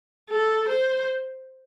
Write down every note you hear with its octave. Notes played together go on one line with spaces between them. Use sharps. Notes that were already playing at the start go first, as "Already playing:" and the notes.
A4
C5